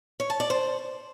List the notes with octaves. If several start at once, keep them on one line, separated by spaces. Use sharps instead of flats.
C#5
A5
D5
C5